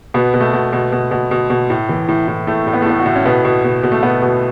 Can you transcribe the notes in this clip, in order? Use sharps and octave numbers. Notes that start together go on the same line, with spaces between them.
B2 B3
B2
A3
B2
B2
B2
B2
B2
B2
A2
E3
A2
A2
A2 A3
A2
B3
A3
A2 B3
F#4
A2
C#4
B2 B3
B2
B2
B2
A3
B2 B3
B2